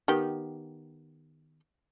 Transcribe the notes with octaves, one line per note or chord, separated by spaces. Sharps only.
D#3 B3 G4